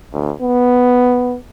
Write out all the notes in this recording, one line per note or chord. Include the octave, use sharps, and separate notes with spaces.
D2
B3